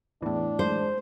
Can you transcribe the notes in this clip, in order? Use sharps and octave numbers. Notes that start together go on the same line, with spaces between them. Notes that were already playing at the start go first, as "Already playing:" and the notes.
E2 A2 E3 D4
G#3 C5